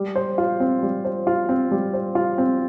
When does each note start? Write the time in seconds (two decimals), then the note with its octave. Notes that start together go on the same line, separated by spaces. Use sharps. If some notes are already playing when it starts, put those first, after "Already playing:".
Already playing: G3
0.16 C5
0.38 F4
0.60 C4
0.83 G3
1.05 C5
1.27 F4
1.49 C4
1.71 G3
1.94 C5
2.15 F4
2.38 C4